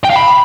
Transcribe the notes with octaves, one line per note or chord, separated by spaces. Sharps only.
G5
F5
B5